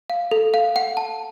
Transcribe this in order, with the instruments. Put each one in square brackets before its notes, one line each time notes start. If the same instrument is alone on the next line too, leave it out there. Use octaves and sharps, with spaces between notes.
[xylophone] F5
A4
F5
F#5
A5